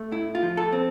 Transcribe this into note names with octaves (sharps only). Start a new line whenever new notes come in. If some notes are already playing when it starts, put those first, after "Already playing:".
Already playing: A3
A2 E4
F4
F3
A4
C4